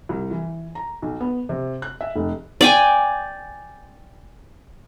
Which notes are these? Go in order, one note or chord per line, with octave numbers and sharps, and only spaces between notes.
C2
E3
A#5
B1
B3
C3
F#6
E5
F1
D5 G5 G#5